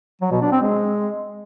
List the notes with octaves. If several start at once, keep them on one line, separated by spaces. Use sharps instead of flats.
F#3
B2
D4
C4
G#3